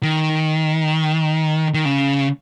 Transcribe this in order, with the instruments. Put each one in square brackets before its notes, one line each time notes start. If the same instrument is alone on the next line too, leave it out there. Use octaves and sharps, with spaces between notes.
[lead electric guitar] D#3
D#3
C#3